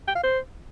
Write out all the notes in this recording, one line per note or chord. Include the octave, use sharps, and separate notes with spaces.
G5
F5
C5